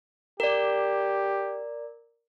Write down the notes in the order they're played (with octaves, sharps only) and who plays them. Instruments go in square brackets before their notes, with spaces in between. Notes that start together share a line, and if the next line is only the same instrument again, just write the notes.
[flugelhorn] G4 [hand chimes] A#4 D5